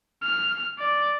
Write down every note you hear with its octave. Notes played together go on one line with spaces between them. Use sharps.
F6
D5